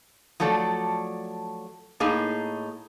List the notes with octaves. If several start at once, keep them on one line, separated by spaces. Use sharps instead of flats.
F3 F#3 A3 A4 D5
A2 A#3 D#4 G#4